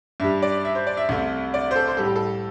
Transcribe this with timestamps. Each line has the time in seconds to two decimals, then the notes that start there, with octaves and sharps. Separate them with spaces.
0.20 G2 G3 E5
0.42 D5
0.65 E5
0.75 C5
0.87 D5
0.97 E5
1.09 C2 C3 A3
1.54 D5
1.71 C5
1.76 A4
1.87 C5
1.97 A2 G3 A4
2.06 G4
2.16 A4